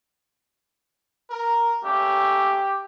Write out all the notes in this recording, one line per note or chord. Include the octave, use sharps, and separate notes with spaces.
A#4
A3 A#3 C#4 G4